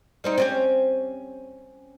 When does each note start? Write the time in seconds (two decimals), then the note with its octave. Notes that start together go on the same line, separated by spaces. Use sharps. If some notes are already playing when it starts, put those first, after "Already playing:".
0.24 G3 C4 D#4
0.38 C4 C#4 G4